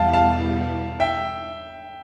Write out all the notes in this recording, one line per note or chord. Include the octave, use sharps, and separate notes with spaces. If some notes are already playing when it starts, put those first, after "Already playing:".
Already playing: E2 B2 G3 B3 E4 F5 A5
F5 A5
E5 G5